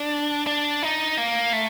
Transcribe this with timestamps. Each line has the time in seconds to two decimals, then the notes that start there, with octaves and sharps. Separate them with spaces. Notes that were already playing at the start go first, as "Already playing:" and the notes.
Already playing: D4
0.47 D4
0.83 D#4
1.17 A#3
1.53 A3